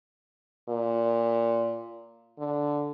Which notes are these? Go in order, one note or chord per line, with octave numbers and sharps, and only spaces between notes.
A#2
D3